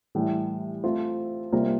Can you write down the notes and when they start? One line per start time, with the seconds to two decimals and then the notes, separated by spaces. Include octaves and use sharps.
0.15 A2 E3 G3
0.84 A3 C4 F4 C5
1.52 C3 G3 A#3 F4 C5